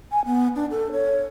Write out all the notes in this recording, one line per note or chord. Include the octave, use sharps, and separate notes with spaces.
G#5
B3
D4
A4
C#5